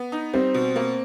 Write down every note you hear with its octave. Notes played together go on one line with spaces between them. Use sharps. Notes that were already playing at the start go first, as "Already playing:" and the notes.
Already playing: B3
D#4
G3 C4
B2
A#3